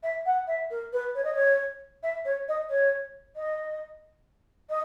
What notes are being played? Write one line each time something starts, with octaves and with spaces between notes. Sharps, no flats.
E5
F#5
E5
A#4
B4
C#5
D#5
C#5
E5
C#5
D#5
C#5
D#5
D#5